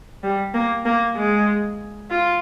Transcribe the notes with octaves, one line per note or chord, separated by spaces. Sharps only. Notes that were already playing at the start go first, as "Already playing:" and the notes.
G3
A#3
A#3
G#3
F4